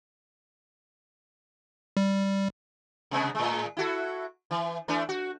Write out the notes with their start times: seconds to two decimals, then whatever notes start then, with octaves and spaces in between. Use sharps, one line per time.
1.97 G3
3.11 C3 G#3 B3
3.35 A2 G#3
3.77 E4 F#4 A4
4.51 E3
4.88 E3 A3 D4
5.09 F#4